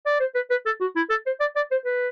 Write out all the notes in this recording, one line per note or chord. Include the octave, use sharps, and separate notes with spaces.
D5
C5
B4
B4
A4
F#4
E4
A4
C5
D5
D5
C5
B4